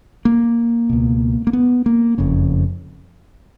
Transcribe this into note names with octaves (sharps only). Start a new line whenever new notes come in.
A#3
C#2 B2
A#3
B3
A#3
F#1 F2 C#3